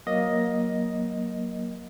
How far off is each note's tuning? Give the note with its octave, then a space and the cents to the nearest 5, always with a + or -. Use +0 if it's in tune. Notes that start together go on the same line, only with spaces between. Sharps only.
F#3 +0 A#3 +15 D#5 +0